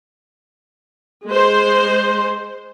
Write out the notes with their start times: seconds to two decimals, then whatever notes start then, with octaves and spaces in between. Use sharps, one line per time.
1.29 G#3 C5